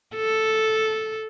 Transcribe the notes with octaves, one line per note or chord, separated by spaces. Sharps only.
A4